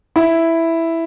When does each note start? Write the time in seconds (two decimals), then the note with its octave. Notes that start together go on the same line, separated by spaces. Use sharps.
0.16 E4